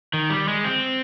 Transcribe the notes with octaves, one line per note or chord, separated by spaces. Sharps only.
D#3
G3
G#3
C4